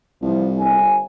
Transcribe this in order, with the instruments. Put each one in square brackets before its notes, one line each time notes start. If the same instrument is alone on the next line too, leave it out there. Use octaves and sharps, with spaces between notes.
[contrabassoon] C2 [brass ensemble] E3 F3
[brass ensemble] G1 G#5